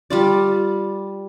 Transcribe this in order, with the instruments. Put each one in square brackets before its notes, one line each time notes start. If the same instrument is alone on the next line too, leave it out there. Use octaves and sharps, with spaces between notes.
[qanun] G3 F4 D5